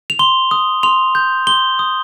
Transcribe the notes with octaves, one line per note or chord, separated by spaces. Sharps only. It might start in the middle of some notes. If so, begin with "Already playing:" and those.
F7
C6 G7
D#6
C6 F7
G6
C6 G7
D#6